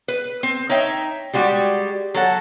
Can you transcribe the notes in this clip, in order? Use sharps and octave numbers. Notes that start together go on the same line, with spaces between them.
B4
C4
D#4 C#5 E5 G5
G3 G#3 F#4 G4
F#3 A4 F#5